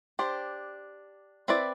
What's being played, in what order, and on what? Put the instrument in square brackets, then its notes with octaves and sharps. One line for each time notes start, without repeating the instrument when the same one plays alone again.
[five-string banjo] D4 G4 C5
C4 E4 B4 D5